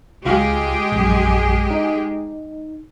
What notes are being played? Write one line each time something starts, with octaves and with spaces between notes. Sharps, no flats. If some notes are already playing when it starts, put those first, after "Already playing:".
C#2 G#3 F4 G4 G#4 F6
A#1 F#2
D#4